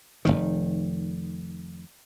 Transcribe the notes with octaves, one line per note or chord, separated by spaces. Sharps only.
F1 B1 D#3